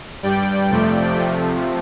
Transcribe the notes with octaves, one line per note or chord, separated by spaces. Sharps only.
G2 G3 D5 G5
F2 C3 F3 A3
C3 F3 A3